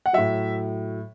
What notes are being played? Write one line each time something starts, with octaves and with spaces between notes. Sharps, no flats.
F#5
A2 F#3 E5